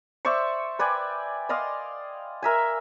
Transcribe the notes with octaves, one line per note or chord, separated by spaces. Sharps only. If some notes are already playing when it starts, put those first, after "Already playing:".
C5 D5 E5 C#6
B4 D5 G5 G#5
D5 D#5 F5 C6
A#4 E5 G#5